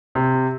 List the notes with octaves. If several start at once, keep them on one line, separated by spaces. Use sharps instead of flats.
C3